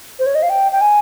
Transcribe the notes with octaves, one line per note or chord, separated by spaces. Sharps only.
C5
C#5
D#5
F5
G5
G5
G#5